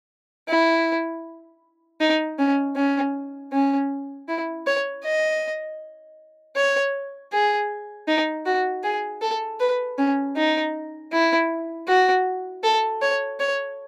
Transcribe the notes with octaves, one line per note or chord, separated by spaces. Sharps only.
E4
D#4
C#4
C#4
C#4
E4
C#5
D#5
C#5
G#4
D#4
F#4
G#4
A4
B4
C#4
D#4
E4
F#4
A4
C#5
C#5